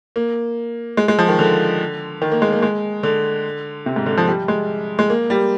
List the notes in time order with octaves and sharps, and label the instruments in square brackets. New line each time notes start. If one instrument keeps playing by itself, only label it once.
[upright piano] A#3
G#3
G#3
F3
D#3
D3
D#3
A#3
G#3
A#3
G#3
D3
C3
G#2
D3
F3
G3
G#3
G#3
A#3
G3